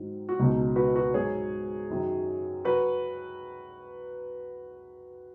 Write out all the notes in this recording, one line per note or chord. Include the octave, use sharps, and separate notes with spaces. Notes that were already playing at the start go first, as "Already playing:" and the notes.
Already playing: G#2 D#3 F#3
F#4
C#2 B2 F#3 D#4
F#4 B4
F#4 B4
G#2 F#3 G#4 C#5
F#2 D#3 F#3
F#3 F#4 B4